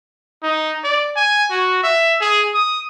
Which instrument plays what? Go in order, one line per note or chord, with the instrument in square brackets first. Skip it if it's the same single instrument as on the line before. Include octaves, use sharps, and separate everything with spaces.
[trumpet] D#4
D5
G#5
F#4
E5
G#4
D#6